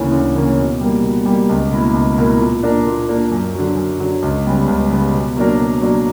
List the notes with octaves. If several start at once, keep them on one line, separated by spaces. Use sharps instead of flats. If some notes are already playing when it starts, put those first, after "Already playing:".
Already playing: D2 C#3 E3 A#3 C#4
D2
C#3 E3 A#3 C#4
B2
G3 A#3
B2
G3 A#3
C#2
B2 A#3 E4 A#4
C#2
B2 A#3 E4 A#4
A#2
A#3 D4 A#4
A#2
A#3 D4 A#4
F#2
D3 F#3
F#2
D3 F#3
C#2
C#3 G3 B3
C#2
C#3 G3 B3
B2
F#3 A#3 D4 A#4
B2
F#3 A#3 D4 A#4